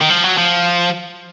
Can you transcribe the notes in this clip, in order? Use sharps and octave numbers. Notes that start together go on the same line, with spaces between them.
D#3
F3
F#3
F3